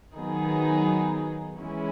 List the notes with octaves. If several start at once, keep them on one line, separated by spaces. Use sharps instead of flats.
D#3 F#3 B3 D#4 G#4
E3 G#3 C#4 E4